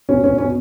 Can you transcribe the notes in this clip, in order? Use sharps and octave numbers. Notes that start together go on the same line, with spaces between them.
B2 C#4
B2 C#4
B2 C#4